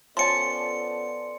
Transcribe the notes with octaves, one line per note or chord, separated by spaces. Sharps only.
F3 B3 C#4 A4 D5 A5 C6 C#7